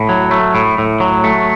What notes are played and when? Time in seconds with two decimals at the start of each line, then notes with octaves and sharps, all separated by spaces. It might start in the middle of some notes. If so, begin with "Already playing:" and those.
Already playing: A2
0.09 F#3
0.31 A3
0.55 A2
0.78 A2
1.00 F#3
1.24 A3